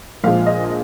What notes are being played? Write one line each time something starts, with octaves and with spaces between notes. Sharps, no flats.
A#1 A#2 F3 G#3 F5
D#5